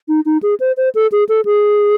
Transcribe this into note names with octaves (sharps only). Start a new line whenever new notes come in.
D#4
D#4
G#4
C5
C5
A4
G#4
A4
G#4